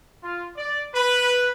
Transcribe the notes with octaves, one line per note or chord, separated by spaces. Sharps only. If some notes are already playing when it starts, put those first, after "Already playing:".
F4
D5
B4